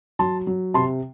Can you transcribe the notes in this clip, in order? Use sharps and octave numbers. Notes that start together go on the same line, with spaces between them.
F#3 A5 C6
F#3
C3 A5 C6